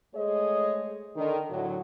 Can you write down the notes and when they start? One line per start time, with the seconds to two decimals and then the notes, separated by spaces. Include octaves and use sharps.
0.15 G#3 A3 G#4 C5 C#5 D#5
1.16 D3 D#3
1.51 A2 D3 F#3